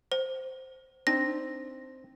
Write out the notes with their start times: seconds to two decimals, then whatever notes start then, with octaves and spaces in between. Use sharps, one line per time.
0.12 C5
1.07 C4 D4 D#4 A#6